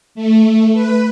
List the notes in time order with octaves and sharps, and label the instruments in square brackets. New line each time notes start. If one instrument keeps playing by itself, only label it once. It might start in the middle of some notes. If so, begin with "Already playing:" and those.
[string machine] A3
B4